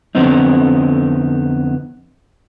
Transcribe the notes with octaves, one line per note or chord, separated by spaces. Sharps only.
F2 D3 B3 C4 D#4